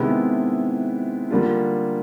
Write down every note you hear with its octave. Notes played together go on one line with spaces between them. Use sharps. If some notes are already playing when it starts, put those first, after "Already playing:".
Already playing: C3 D#3 G#3 B3 E4
D3 G3 A#3 D4 F4